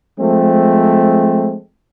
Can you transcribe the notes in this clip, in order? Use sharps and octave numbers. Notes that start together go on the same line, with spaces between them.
F3 G#3 A3 C4